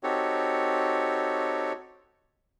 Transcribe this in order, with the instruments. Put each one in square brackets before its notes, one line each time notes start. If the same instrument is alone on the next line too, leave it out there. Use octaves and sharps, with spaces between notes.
[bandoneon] C4 D#4 F#4 G4 A4 C#5